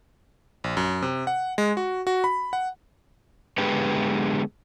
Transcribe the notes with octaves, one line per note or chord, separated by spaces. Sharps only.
A#1
F#2
C3
F#5
G#3
F#4
F#4
B5
F#5
D3 G#3 B3 G4 G#4 B4